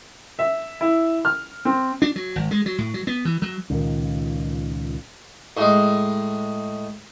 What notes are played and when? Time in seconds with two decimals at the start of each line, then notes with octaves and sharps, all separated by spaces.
0.39 E5
0.81 E4
1.25 F6
1.65 C4
2.02 D4
2.16 F#3
2.36 G#1
2.51 G#3
2.66 F#3
2.78 A2
2.94 F#3
3.07 B3
3.25 E3
3.42 F#3
3.70 C#2 A#2 D#3
5.57 A2 G#3